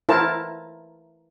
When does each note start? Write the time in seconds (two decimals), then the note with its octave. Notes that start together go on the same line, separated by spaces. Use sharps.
0.09 E4 A#4 C5 A5